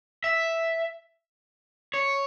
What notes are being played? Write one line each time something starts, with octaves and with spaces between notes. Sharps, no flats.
E5
C#5